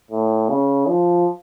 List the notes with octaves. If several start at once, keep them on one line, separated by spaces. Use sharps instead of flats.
A2
C#3
F3